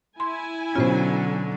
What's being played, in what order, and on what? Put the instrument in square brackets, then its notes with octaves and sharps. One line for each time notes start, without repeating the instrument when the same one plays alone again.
[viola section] E4 G#5 [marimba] C6
[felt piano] B2 C#4 [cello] D3 F#3 [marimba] F4 C5